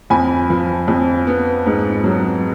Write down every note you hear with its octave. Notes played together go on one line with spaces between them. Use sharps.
F2 G#5 B5
F3
F2
B3
G#2
F#3